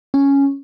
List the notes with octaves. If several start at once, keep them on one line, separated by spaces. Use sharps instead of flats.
C#4